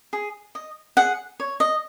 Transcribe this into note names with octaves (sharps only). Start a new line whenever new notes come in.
G#4
D#5
G#4 F#5
C#5
D#5